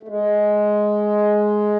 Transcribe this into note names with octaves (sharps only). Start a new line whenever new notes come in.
A3
G#3